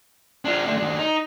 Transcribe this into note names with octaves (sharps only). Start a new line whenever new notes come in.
D4 F4
A3 D4
D#2 D4
D#4